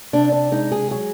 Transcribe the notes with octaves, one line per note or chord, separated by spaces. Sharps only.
C3 D4
D4
G#3 D#4
G#4
F#3 G#4